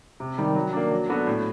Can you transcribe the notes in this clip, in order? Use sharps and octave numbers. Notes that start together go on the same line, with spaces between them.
C3
D#3 G3
F#3
A#3 D4
F#3
B3 D4 F#4 A4
A2